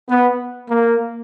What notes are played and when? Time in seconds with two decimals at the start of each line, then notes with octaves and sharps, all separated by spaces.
0.09 B3
0.69 A#3